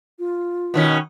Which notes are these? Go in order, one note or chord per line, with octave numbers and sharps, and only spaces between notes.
F4
B2 D#3 C#4